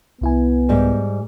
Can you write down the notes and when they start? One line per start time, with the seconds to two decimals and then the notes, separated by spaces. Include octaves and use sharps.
0.21 C2 B3 E4 G#5
0.69 G#2 G3